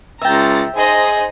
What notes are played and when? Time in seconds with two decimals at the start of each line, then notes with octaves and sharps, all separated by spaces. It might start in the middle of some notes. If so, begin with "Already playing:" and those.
0.22 C#2 E5 G5 A#5 A6
0.76 D#4 G#4 C5 D#5